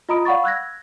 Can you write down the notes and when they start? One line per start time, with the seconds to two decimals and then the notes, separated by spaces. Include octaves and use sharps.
0.09 F4 D#5 A#5 B5 D#6 D7
0.25 D5 F5 F#5 B5 C#6 A6
0.44 E6 F#6 G#6 A#6